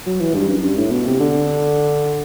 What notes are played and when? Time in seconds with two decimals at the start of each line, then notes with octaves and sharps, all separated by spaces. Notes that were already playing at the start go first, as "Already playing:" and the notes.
0.07 F#3
0.21 E3
0.34 G2
0.48 F#2
0.63 G2
0.77 A2
0.91 B2
1.06 C3
1.20 D3